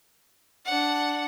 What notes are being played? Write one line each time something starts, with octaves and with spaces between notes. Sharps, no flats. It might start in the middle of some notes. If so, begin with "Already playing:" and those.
D4 F#5